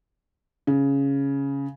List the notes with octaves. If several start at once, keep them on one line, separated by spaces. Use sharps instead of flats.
C#3